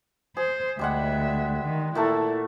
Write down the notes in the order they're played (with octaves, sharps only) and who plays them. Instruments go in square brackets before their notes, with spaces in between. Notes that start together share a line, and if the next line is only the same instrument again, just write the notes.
[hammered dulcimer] G#4 [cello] C5
[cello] D2 E5 [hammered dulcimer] G3 G#3 F#5
[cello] D#3
[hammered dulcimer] A#2 A3 A4 [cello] E4